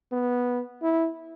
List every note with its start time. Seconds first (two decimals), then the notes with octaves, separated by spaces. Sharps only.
0.12 B3
0.83 E4